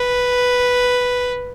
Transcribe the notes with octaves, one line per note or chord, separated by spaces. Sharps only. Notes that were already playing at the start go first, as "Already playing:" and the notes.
Already playing: B4